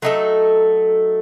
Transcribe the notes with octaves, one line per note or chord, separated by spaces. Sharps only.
F#3 A3 D#4 A4